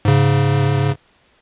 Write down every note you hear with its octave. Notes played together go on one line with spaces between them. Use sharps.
G#2 C#3